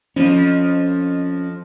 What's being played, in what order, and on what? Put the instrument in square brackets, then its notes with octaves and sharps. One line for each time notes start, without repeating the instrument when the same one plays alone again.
[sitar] F2 F3 [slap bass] C#4